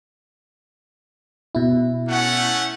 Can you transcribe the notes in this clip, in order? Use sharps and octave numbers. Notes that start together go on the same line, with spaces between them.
B2 E4
A3 C#4 F#5